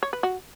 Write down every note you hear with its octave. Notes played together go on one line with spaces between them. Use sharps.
C#5
B4
F#4